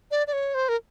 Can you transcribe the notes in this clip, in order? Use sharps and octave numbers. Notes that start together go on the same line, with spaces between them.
D5
D5
C#5
C5
A#4